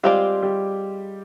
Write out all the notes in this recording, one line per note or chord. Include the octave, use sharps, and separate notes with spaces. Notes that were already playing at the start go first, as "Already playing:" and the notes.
G3 G#3 C4 F4 G4 A4 D5
G3 G4